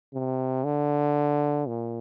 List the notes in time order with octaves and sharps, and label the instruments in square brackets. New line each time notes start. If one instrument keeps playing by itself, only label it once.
[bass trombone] C3
D3
A#2